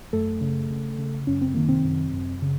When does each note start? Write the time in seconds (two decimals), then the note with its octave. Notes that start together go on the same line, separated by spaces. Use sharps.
0.13 F#2 A3 A4
0.41 C#3
0.70 C#3
0.98 C#3
1.27 F#2 C#4
1.42 C4
1.54 D#3 A#3
1.68 C3 C4
1.84 F#2
2.13 F#2
2.42 C#3